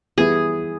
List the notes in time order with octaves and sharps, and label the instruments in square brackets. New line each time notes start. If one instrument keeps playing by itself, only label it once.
[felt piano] E3 G3 B3 E4 [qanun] G#4